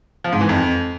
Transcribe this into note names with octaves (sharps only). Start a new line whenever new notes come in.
F3
G#2
E3
F2